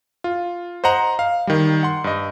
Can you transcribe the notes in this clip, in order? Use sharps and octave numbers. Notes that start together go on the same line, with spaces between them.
F4
C5 D#5 F#5 A#5
F5
D#3 G3
F#5 C6
G2 D#5